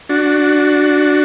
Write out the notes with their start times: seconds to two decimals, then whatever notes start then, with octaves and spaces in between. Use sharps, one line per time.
0.09 D4 F#4